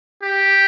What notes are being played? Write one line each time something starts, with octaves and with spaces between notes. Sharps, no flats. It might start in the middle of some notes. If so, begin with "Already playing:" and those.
G4